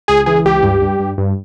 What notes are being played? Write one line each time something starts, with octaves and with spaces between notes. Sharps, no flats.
C#2 G#4
E3 G#4
C#2 G4
G2
G2
G2
G2